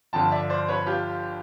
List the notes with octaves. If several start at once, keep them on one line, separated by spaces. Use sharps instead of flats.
G1 G2 D3 F3 G5 A5
D5 E5
C5 D5
B4 C#5
F4 G4